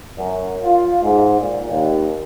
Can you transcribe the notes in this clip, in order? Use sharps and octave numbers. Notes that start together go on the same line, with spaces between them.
F#2
F4
G#2
A#2
D#2